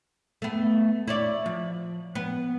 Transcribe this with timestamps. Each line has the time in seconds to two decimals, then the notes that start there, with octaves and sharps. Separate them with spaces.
0.42 A3 B3
1.08 E4 C#5 D5
1.46 F3
2.15 B3